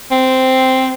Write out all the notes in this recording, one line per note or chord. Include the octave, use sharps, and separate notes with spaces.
C4